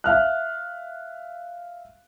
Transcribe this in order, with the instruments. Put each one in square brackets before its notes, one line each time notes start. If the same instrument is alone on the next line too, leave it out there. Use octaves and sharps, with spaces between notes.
[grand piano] E5 F5 F6 F#6